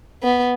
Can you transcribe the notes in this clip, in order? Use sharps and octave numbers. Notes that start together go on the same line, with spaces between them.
B3